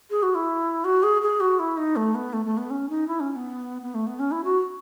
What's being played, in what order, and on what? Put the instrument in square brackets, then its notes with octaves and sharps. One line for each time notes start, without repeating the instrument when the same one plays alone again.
[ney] G#4
F#4
E4
F#4
G#4
G#4
F#4
E4
D#4
A3
B3
A3
A3
B3
C#4
D#4
E4
C#4
C#4
B3
B3
A3
B3
C#4
E4
F#4